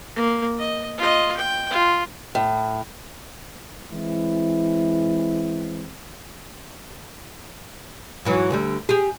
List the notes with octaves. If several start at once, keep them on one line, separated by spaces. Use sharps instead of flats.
A#3
D#5
F4 D#5
G5
F4
A2
E3 G#3 C4 E4
G#2 E3 F#3
D2 D3 G3
G4 G#4